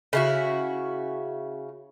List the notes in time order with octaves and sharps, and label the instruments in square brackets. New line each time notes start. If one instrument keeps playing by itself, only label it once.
[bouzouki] C#3 E4 F#4